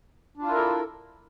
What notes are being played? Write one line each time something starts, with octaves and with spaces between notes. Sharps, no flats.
D4 E4 F4 A4 A#4